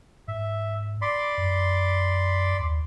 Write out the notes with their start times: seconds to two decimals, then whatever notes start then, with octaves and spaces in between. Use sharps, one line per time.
0.28 G#2 E5
1.02 D5 B5 C6
1.38 F#2
2.59 D#2